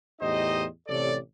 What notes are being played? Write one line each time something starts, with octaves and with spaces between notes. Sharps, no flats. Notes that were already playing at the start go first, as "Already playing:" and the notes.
E2 A2 D#4 G4 C5 D#5
A1 C3 A4 C#5 D5